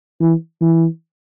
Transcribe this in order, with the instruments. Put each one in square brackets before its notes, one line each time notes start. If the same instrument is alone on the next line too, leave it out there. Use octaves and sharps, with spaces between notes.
[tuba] E3
E3